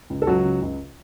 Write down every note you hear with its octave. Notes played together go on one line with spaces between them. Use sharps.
C#2
A4
C#2 F#3 F#4
C#3
C#2